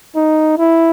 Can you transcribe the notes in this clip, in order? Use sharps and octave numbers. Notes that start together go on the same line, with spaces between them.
D#4
E4